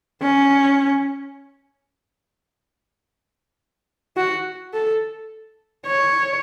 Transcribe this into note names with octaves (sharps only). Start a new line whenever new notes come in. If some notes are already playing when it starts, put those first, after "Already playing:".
C#4
F#4
A4
C#5